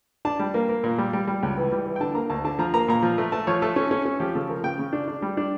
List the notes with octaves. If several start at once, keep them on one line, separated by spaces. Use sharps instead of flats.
D4 A5
G3
A#3
A#3
A#2
G3
G3
G3
C#2
E3
G3
E3
G5
D3 A5
A#3 A#5
D2 A5
D3 A5
F3 A#5
A#3 A#5
A#2 A#5
F3
A3
A3 A5
F3 C#5
A3 A4
C#4
C#4
C#4
F3 G4
C#3 A4
F3 A#4
C#3 G5
C#3
D4
D4
G3
D4